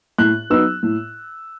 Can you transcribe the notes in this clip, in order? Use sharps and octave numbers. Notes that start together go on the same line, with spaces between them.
A2 F#6
F#3 B3 D#4 E6
A2